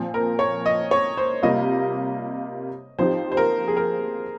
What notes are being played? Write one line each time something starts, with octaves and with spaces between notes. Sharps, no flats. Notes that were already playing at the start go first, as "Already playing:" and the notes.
Already playing: A#2 F3 C4
A#4
C#5
D#5
C#5
C5
C3 G3 A#3 F4 D#5
F3 C4 D#4 G4 C5
C5
A#4
G#4
A#4